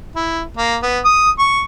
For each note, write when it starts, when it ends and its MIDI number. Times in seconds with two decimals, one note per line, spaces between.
0.16 0.41 64
0.57 0.77 58
0.83 0.99 59
1.05 1.30 87
1.39 1.63 85